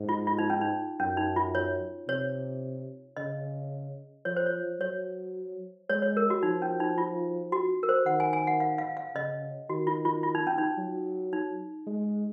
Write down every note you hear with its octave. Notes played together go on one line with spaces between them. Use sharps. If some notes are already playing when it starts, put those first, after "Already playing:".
Already playing: G#2
F4
F4
D#4
C#4
D#4
F#2 C#4
D#4
F4
C#5
C3 C#5
C#3 D#5
F3 C#5
C5
C#5
F#3 C#5
G#3 C#5
C#5
A#4
F#4
F3 D#4
C#4
D#4
F4
F#4
A#4
C5
D#3 F#5
G#5
G#5
F#5
F5
F5
F5
C#3 D#5
D#3 F#4
F4
F4
F4
D#4
C#4
D#4
F#3
D#4
G#3